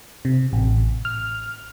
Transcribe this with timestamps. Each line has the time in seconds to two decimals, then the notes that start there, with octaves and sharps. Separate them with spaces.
0.25 C3
0.53 A1
1.05 F6